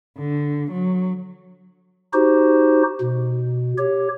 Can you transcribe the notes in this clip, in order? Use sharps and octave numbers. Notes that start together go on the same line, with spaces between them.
D3
F#3
D#4 F#4 G4 C5
B2
G4 C#5